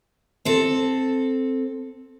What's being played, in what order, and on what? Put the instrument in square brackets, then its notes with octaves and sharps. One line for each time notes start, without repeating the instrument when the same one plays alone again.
[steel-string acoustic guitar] C4 A4